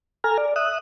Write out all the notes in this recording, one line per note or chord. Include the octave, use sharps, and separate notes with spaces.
A4 G#5 A#5 F6
D5
E5 D#6 F#6